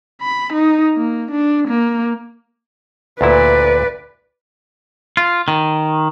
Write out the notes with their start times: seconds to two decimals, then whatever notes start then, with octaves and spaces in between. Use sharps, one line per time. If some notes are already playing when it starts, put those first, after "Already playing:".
0.21 B5
0.53 D#4
0.97 A#3
1.31 D4
1.68 A#3
3.21 D2 A#2 E4 B4 D5
5.17 F4
5.48 D#3